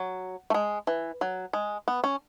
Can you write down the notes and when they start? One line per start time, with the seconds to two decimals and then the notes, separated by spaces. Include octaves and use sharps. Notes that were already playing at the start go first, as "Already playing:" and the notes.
Already playing: F#3
0.50 A3
0.54 G#3
0.87 E3
1.21 F#3
1.53 G#3
1.88 B3
2.04 C#4